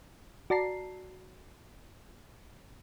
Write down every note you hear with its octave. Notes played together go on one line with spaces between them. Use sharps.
F#4 D5 A5 A#5 C7